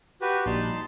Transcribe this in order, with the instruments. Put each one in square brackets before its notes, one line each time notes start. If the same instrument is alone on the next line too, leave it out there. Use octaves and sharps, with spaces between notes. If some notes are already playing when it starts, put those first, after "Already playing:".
[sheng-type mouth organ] F#4 G4 B4
[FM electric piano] A#1 G3 [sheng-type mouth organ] D#4 A5 C6